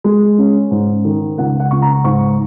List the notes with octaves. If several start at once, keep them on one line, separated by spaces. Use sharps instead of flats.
G#3
C#4
G#2
D#3
C#2 F#5
F#5
C#2 C#6
A#5
G#2 C#6